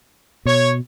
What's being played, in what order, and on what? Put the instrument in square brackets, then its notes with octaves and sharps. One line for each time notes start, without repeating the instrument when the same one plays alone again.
[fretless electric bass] B2 [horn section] C#5